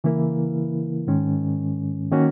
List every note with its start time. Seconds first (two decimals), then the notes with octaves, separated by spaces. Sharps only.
0.04 C#3 E3 A#3 E4 A#4
1.07 G#2 D#3 G#3 C#4
2.12 D#3 A#3 C#4 F#4